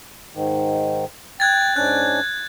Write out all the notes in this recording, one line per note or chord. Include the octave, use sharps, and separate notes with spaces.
G#2 D#3
G5 F#6 G#6 A6
G#2 C#4 D4 F#6